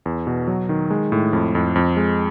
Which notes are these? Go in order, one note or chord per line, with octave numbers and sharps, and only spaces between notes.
E2
B2
F#3
D#3
G#3
A2
F2
F2
F2
G#3